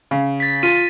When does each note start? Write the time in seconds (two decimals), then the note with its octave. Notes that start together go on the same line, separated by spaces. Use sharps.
0.11 C#3
0.40 A6 B6
0.63 F4 B6 D#7